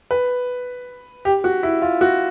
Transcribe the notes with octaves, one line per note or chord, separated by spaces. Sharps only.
B4
G4
F#4
E4
F4
F#4